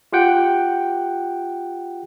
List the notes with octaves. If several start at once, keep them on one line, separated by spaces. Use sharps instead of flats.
F4 G4 F#5 G5